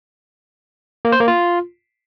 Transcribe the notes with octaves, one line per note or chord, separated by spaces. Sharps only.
A#3
C5
A#3
F4